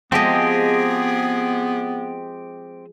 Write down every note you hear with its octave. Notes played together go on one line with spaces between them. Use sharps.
F3 G#3 B3 C4 G4 G#4 D#5